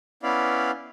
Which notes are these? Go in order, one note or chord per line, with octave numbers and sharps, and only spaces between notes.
B3 C#4 E4 D5 F5 B5